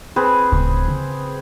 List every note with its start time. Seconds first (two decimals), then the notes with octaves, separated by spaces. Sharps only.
0.16 C4 G#4 B4
0.52 D1 C#3
0.88 C#3